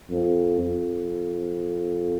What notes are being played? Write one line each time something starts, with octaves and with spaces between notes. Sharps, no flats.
F2
F2